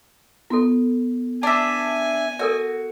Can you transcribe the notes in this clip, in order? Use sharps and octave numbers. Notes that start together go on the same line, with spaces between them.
B3 F4 A4 C6
D4 E5 G#5 A5
F#4 A4 A#4 D5